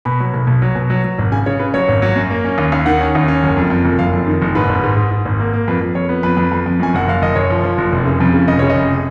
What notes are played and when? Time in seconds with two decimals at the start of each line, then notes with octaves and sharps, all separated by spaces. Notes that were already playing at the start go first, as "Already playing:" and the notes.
0.05 B2 B5
0.20 F#3
0.34 B1
0.47 B1
0.62 F#3
0.75 B2
0.90 F#3
1.04 F#3
1.19 G#1
1.32 C#3 G#5
1.46 C#3 C#5
1.59 C#3 B4
1.74 F#3 C#5
1.88 G#1
2.02 F#3
2.16 F#2
2.30 A#3
2.45 C#4
2.58 D#2
2.72 D#2
2.86 D#3 F#5
3.00 C#4
3.15 D#2
3.28 C#4
3.43 F#1
3.57 F2
3.70 F2
3.85 F#1
3.99 F#1 F5
4.13 F2
4.27 D#3
4.42 F#1
4.55 G#2 B4
4.69 G#1
4.83 G#2
4.97 G#2
5.11 G#2
5.25 G#1
5.40 A#3
5.53 A#3
5.68 F2 B4
5.81 F2
5.95 F2 C#5
6.09 B3
6.23 F2 B4
6.37 F2
6.52 F2
6.66 F2
6.80 F#2 G#5
6.94 F#1 F#5
7.07 F#1 F5
7.22 F#1 D#5
7.35 F#1 C#5
7.50 F3
7.64 F3
7.78 F#1
7.92 F1
8.05 C#3
8.20 F2
8.34 C#3
8.48 F1 D#5
8.59 C#3 C#5
8.70 D#5
8.77 F1